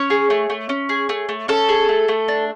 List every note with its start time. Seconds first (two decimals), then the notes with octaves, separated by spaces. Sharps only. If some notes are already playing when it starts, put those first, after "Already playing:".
Already playing: C#4 C#5
0.10 G#4
0.30 A3
0.50 A3
0.69 C#4
0.89 G#4
1.09 A3
1.29 A3
1.48 C#4 A4
1.69 G#4
1.89 A3
2.08 A3
2.28 D4